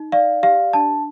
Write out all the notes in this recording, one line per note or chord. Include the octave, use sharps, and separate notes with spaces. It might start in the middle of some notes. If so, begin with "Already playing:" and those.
Already playing: D#4
D5 F5
G4 F5
D4 A5